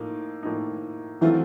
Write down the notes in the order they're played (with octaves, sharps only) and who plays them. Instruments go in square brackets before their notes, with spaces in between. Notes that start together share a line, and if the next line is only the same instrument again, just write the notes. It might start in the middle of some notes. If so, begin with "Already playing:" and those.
Already playing: [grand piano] A2 F3 A#3 D#4
A2 F3 A#3 D#4
[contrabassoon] E3 [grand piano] F#3 A3 C4 F4 A4